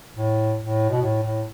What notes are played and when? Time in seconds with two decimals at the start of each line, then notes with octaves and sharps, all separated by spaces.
0.16 A2
0.60 A2
0.90 B2
1.01 A2
1.23 A2